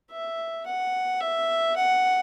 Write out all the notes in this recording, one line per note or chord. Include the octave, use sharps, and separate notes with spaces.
E5
F#5
E5
F#5